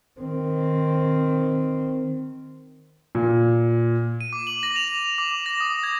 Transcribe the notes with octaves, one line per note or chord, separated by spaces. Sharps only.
D#3 C4
A#2
D#7
D6
F#7
A#6
F7
F7
F7
D6
D6
A#6
D#6
G#6